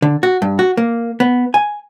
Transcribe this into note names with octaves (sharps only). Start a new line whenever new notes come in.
D3
F#4
G2
F#4
A#3
B3
G#5